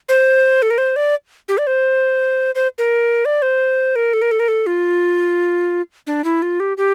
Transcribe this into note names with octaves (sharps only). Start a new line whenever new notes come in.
C5
A4
A#4
C5
D5
G4
D5
C5
C5
A#4
D5
C5
A#4
A4
A#4
A4
A#4
A4
F4
D4
E4
F4
G4
G4